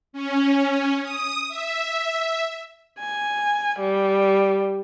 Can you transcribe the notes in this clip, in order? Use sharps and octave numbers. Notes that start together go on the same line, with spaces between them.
C#4
D#6
E5
G#5
G3